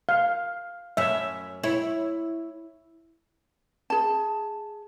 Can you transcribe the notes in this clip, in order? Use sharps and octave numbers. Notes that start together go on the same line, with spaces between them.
F5
F#2 C#4 E5
E4 C#5
G#4 A5